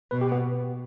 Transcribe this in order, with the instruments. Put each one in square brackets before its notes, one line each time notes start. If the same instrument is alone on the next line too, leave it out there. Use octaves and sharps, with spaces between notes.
[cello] B2 [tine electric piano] B4
[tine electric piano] G4
B3